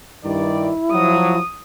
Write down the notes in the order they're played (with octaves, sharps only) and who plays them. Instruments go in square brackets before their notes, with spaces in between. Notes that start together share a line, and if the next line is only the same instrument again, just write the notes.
[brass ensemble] G2 D#3 D5 [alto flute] E4
[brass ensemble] F3 F#3 [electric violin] D#6